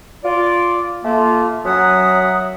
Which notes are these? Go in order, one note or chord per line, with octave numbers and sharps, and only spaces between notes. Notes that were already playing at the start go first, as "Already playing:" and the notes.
F4 D5
A3 A#3 F4
F#2 F#3 E5 F#5 D#6